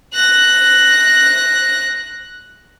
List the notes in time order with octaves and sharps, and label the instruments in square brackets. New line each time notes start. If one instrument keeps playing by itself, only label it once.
[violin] F#6 A#6